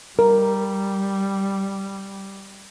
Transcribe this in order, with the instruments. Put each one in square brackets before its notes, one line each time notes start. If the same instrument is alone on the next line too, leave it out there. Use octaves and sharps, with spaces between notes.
[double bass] G3 [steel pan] A#4